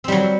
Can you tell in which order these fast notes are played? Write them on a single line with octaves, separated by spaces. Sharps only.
C4 G3 F#3